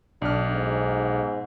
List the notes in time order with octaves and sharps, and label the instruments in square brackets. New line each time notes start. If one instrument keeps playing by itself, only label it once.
[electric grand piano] B1 F6 [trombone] D4
[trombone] G#2